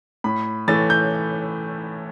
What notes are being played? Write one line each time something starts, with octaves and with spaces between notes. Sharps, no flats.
A2 B5
E3 A3 A6
G6